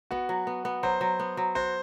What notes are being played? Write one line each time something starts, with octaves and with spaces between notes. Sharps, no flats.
B3 F#4
F#3
B3
B3
F#3 C5
F#3
B3
F#3
F#4 C5